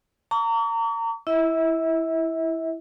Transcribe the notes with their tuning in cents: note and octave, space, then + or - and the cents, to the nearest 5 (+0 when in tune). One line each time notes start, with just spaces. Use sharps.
A#5 -30 C#6 +45
E4 +0 E5 -35